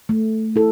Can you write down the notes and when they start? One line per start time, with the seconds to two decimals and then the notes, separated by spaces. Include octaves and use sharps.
0.09 A3
0.56 E4 A4